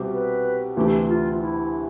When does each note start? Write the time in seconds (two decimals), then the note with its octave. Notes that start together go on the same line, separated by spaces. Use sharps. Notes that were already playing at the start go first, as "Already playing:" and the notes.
Already playing: C2 B2 G3 C4 G4
0.13 B4
0.76 D2 C3 E3 A3 G4
1.09 F4
1.40 E4